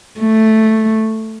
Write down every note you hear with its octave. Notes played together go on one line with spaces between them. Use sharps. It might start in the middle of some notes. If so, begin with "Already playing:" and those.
A3